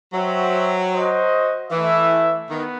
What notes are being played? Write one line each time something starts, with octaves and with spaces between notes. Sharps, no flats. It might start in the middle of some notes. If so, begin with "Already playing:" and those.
F#3 F#4 C5 E5 G5
F#4 C5 D#5
E3 A3 E4 B4 E5
D#3 B3